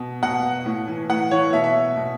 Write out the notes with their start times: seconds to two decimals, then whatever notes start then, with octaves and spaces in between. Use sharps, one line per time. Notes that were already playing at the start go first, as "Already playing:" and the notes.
Already playing: B2
0.23 B2 F#5
0.66 A2
0.88 E3
1.10 A2 F#5
1.31 E3 C#5
1.53 B2 E5
1.64 E5
1.97 B2